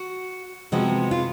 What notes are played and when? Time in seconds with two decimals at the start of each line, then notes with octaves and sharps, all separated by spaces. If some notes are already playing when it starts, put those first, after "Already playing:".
Already playing: F#4
0.72 C3 F3 G#3 B3 F#4
1.11 F4